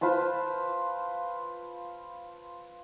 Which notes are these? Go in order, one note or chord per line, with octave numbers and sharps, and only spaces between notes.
F4 B4 C5 A5